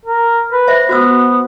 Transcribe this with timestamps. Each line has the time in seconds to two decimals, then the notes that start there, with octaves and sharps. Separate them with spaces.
0.05 A#4
0.52 B4
0.67 C5 E5
0.89 B3 F#4 C5 E6